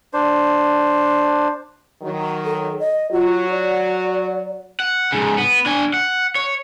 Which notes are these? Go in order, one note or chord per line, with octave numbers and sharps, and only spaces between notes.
D4 C5
D#3 F#3
A4
D#5
F#3 F4 F#4
D5
F#5
G#2 C#3
B3
D4 G#5
F#5
C#5